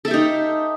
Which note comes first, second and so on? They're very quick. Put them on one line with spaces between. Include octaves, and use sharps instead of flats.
A4 E5 G4 D#4